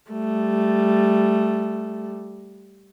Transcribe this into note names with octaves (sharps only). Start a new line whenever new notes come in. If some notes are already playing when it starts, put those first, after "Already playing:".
G3 A3